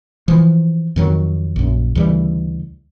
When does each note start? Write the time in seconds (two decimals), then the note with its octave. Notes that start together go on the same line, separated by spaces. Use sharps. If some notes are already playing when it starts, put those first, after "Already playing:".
0.28 E3 F3
0.96 F2 D#3 F#3
1.56 A#1 F#2
1.95 D2 C#3 E3 G3